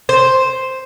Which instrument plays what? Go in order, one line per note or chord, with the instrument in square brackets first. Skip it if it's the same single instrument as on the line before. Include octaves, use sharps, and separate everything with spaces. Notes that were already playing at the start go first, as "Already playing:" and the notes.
[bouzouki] C5